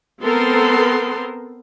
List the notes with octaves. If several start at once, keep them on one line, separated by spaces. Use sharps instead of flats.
B3 C4 A4 A#4 C6